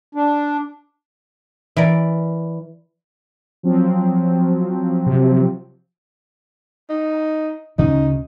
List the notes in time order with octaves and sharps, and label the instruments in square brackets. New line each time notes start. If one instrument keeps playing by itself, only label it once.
[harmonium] D4
[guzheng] E3 A#4 D5
[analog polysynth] F3 F#3 C4
[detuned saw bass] C3
[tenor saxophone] D#4
[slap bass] D2 C#3 C#4 [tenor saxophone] D#4